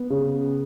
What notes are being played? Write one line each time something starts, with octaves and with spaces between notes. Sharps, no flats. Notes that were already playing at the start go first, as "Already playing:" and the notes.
Already playing: B3
C#3